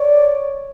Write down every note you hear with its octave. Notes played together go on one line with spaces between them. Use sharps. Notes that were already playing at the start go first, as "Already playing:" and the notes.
Already playing: C#5 D5